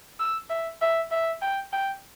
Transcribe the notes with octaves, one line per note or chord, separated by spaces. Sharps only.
E6
E5
E5
E5
G5
G5